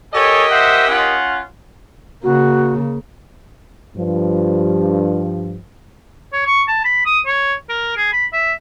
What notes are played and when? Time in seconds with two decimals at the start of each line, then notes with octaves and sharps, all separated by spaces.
0.13 G4 A4 A#4 C#5 D#5 G#5
0.51 C5 E5 F#5
0.88 C#4 F4 F#5
2.23 C#3 A#3 F#4
3.96 G2 F3
6.33 C#5
6.47 C#6
6.68 A5
6.85 B5
7.06 D#6
7.26 C#5
7.69 A#4
7.97 G#4
8.13 B5
8.33 E5